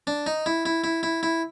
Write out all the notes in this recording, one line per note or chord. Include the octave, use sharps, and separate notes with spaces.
D4
D#4
E4
E4
E4
E4
E4